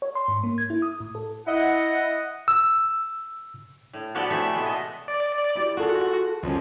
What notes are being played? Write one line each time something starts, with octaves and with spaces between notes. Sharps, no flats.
C#5
C6
G#2
A#3
G#6
E4
D#6
A2
A4
E4 D#5 F#5
E6
A2
F3 B3 F#4 G4 A4 D5
A2 C3 E3 A3 E5
G#3 A3 B3
B2 D#5
D5
E4 G4
F4 F#4 G#4 A4
C#2 F3 G3 C#4